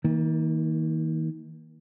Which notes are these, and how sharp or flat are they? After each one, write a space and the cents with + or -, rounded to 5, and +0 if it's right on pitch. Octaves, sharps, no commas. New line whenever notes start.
D#3 +40 A#3 +0